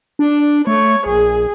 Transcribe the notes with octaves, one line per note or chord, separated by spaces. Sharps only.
D4
A3 C#5
A#1 G#4